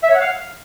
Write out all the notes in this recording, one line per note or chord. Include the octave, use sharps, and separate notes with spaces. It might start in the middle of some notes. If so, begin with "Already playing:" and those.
E5
C#5
F#5
F5